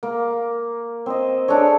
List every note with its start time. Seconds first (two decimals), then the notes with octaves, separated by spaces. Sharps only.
0.03 A#3
1.06 C4 C5 D#5
1.48 D4 G#4 A4 C#5